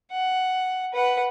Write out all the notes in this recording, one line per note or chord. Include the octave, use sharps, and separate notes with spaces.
F#5
B4 F#5